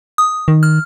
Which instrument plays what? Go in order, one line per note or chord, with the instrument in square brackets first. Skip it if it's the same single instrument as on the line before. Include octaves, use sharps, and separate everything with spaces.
[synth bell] D#6
[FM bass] D#3
[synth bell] F6